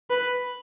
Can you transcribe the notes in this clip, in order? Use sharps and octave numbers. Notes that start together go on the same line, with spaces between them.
B4